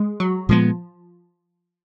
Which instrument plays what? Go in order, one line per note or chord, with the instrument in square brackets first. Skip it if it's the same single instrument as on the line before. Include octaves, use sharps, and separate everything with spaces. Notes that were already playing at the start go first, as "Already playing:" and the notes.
Already playing: [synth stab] G#3
F#3
[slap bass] A#2 G#3 B3 [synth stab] F3